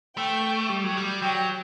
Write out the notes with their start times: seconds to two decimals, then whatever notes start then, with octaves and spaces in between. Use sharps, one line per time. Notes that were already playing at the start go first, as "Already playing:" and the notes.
0.17 A3 G5
0.69 G3
0.84 F#3
0.97 G3
1.22 F#3 G5